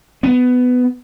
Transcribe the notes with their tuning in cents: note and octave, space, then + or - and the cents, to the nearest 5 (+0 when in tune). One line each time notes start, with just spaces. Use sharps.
B3 +15